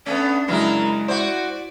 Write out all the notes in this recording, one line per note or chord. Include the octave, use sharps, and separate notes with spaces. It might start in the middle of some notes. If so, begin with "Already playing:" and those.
A3 B3 C#4 D4
F#2 C#3 E3 G#3 E4 A#4
E4 F#4 C5 D5